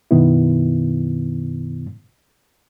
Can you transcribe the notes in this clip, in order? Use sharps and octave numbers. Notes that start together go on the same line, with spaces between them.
F#2 B2 D#3 B3 E4